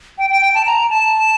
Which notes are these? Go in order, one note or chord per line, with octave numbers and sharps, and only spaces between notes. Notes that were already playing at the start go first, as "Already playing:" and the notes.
G5
G5
G5
A5
A#5
A5